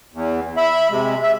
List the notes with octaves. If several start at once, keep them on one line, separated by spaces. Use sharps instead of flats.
E2
E5 B5
C3 G#3
E5